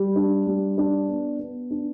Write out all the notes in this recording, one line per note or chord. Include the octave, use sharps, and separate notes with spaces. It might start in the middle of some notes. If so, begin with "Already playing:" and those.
Already playing: G3
D4
G3
D4
B3
B3
D4